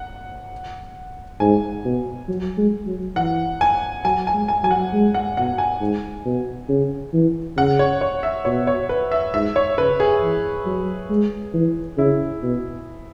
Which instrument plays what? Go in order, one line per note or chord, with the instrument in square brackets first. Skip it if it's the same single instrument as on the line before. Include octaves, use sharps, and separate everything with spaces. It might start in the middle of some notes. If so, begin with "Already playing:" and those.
Already playing: [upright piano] F#5
[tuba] G#2 [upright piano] G#5
[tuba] B2
F#3
G#3
F#3
[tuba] E3 [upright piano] F#5
[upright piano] G#5
[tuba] F#3 [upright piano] G#5
[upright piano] G#5
[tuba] G#3
[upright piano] G#5
[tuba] F#3 [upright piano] G#5
[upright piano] F#5
[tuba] G#3
[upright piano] F#5
[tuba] B2 [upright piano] F#5
[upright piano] G#5
[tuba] G#2
B2
C#3
E3
[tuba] C#3 [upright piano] F#5
[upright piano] C#5
C#5
E5
[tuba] B2 [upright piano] C#5
[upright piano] C#5
B4
E5
[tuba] G#2 [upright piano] E5
[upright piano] C#5
[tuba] C#3 [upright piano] B4
[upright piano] G#4
[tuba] E3
F#3
G#3
E3
[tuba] C#3 [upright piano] E4
[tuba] B2